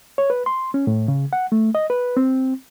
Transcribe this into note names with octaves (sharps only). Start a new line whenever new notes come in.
C#5
B4
C6
C#4
A2
C#3
F#5
A3
D#5
B4
C4